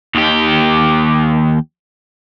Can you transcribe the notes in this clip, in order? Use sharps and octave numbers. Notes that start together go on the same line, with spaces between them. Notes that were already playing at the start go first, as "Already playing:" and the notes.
D#2 G4